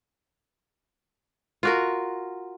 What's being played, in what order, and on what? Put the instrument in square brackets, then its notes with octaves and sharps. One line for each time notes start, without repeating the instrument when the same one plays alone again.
[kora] F4 F#4 A#4